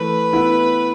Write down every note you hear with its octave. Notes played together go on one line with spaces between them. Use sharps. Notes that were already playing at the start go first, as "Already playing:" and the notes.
Already playing: E3 A3 B4
B3 E4